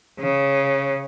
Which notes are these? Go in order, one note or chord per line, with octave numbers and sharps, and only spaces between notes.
C#3